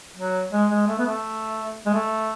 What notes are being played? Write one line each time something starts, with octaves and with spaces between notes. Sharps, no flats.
F#3
G#3
G#3
A3
B3
A3
G#3
A3